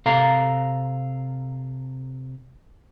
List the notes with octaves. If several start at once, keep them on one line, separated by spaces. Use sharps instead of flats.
C3 A4 F5 A#5